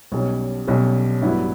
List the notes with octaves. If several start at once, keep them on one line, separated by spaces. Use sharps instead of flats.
B1 B2 G3 C#4
B1 B2 G3 C#4
A1 G2 F#3 B3 E4